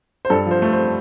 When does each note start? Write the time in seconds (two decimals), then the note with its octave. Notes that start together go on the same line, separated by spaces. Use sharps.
0.25 C5
0.30 G2 A4
0.46 F3 C5
0.62 A3
0.73 C5